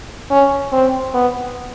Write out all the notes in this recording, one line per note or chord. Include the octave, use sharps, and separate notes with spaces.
C#4
C4
B3